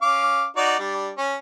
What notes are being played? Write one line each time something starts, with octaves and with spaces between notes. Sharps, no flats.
C#4 F5 D6
D#4 F#4 D5
G3 D4
C#4